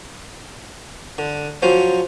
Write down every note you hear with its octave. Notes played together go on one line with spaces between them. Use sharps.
D3
F3 F#3 C#4 C5